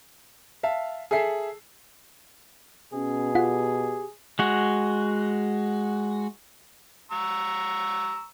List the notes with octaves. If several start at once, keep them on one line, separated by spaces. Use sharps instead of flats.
E5 F5 A5
G#4 A4 E5 C7
B2 C#4 G#4
F4 G4 F#5
G#3 F#4
A#5 C#6 E6